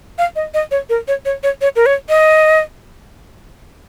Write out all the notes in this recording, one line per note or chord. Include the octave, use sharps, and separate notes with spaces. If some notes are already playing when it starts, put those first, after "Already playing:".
F5
D#5
D#5
C#5
A#4
C#5
C#5
C#5
C#5
A#4
C#5
D#5